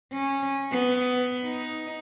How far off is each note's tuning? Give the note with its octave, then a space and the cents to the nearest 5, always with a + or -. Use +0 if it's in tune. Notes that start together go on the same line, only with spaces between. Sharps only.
C#4 -15
B3 +15
D#4 +10